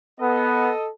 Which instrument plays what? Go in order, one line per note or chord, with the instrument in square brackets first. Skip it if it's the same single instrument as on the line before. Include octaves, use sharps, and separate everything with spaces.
[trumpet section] B3 [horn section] A4 D#5